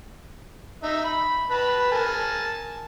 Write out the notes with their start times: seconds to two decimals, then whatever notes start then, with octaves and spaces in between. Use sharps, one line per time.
0.83 D#4 E5
1.04 B5
1.50 B4 A5 B5
1.92 A#4 G#5 A5